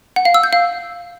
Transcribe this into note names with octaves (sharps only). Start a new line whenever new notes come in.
F#5
F5
E6
G6
F5